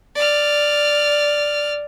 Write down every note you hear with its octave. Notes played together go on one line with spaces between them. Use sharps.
D5 F6